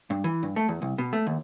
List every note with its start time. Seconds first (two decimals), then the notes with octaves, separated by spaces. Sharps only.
0.10 G2
0.24 E3
0.43 G2
0.56 A3
0.68 E2
0.82 C2
0.98 B2
1.13 A3
1.26 D#2